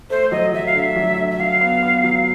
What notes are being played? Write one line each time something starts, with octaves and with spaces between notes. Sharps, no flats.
A3 C5
F#3 D#5
F#3 E5
F5
D3 E5
F#3
D3
E5
F#3 F5
B3
B3
F#3